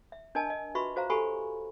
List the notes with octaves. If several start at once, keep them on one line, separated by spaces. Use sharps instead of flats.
E5
D4 A#4 D#5 G#5 A5
D#5
F4 F#4 B4 E5 B5 C#6
F#4 C5 F5 A#5
F#4 G4 A4 G#5 B5 C#6